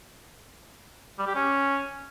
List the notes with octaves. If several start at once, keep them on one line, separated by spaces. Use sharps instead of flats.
G3
G4
C#4